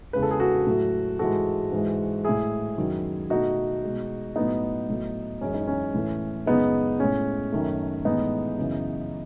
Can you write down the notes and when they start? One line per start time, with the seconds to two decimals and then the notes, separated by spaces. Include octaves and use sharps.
0.13 E2 C#3 G#3 B4
0.22 A4
0.31 G#4
0.40 F#4 A4
0.67 A2 F#3 A3
1.19 G#2 E3 G#3 F#4 A4
1.72 G#2 E3 G#3
2.25 A2 G#3 E4 G#4
2.78 F#2 D#3 F#3
3.30 B2 A3 D#4 F#4
3.83 B2 G#3
4.36 A2 F#3 A3 B3 D#4
4.89 A2 F#3 A3
5.41 F#2 E3 G#3 C#4
5.54 D#4
5.67 C#4
5.94 A2 E3 A3
6.46 F#2 C#3 G#3 B3 D#4
7.00 A2 G#3 C#4
7.52 F#2 D#3 A3
8.05 A2 E3 G#3 B3 D#4
8.58 F#2 C#3 E3